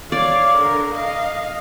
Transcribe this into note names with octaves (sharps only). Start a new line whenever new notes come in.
C#5 D5 F5
D3 A#4
D#5 F5